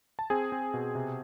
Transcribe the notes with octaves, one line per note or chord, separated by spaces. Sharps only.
A5
C4 G#4 G#5
C4
B2
C3